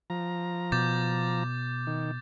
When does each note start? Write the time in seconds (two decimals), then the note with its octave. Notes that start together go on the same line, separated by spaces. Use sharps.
0.10 F3 A#5
0.72 B2 D6 G6 A6
1.87 D#3